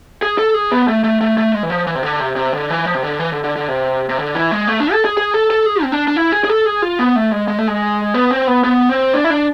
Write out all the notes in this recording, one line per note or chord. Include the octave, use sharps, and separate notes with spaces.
G#4
A4
G#4
B3
A3
A3
A3
A3
G#3
E3
F3
E3
C3
D3
C3
C3
D3
E3
F3
C3
D3
E3
D3
D3
D3
C3
C3
D3
E3
G#3
A3
D4
A4
G#4
G#4
A4
A4
G#4
C4
D4
D4
E4
G#4
G#4
A4
G#4
F4
B3
A3
G#3
G#3
A3
G#3
B3
C4
B3
B3
C4
D4
E4
D4